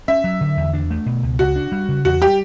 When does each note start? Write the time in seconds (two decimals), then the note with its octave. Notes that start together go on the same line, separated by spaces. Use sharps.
0.08 C#4 E5
0.24 F#3
0.41 D3
0.57 E2
0.73 D4
0.90 A3
1.06 B2
1.23 C#2
1.39 C#3 F#4
1.56 D4
1.72 G3
1.88 C#3
2.05 E2 F#4
2.22 G3 G4